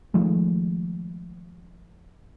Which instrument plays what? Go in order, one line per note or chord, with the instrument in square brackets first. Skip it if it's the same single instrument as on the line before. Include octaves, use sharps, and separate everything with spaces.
[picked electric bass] D#3 F3 G#3 A3